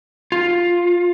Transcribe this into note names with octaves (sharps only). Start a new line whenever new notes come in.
F4